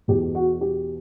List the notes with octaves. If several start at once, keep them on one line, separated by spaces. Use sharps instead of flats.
E2 B2 G4
F#4
G4